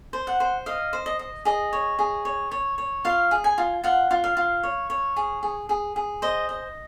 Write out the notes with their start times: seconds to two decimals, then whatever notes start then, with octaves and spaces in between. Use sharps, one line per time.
0.13 C5
0.27 F#5
0.40 C5
0.66 D#5 F5
0.93 C5
1.06 D#5
1.19 D#5
1.45 G#4 D#5
1.73 C#5
1.99 G#4
2.25 C#5
2.51 C#5
2.78 C#5
3.05 F4 F5
3.31 G#4
3.44 G#5
3.58 F4
3.84 F4 F#5
4.11 F4
4.24 F5
4.37 F4
4.63 C#5
4.90 C#5
5.16 G#4
5.43 G#4
5.69 G#4
5.96 G#4
6.22 C5 D#5
6.49 D#5